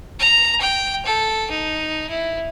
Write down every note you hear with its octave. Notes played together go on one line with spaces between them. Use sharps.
A#5
G5
A4
D#4
E4